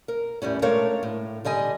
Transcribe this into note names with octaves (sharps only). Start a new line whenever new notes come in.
A#4
E2 A2 G3 C#4
G#3 A3 D4 A#4 C#5 F5
A2
D3 G3 D#5 G#5